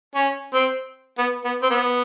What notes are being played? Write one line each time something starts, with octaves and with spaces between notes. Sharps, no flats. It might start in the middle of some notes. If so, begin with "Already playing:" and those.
C#4
C4
B3
B3
C4
B3